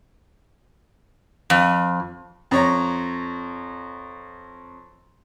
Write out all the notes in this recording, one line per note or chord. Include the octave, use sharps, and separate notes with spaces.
F2
F2 C#5 A#5